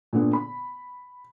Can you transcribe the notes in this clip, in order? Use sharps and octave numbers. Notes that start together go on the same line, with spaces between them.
A#2 D3 B3
B5